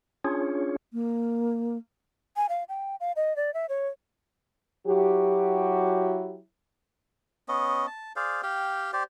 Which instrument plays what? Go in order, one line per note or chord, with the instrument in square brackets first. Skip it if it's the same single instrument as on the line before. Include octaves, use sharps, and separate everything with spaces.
[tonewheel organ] C#4 D4 F4 G#4 C#5
[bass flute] A#3
[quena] G#5
F5
G5
F5
D#5
D5
E5
C#5
[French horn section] F#3 E4 F#4 G4
[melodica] B3 C#4 D#5
A5
G#4 C5 D5 F5
G4 F5 G5
G4 C5 D5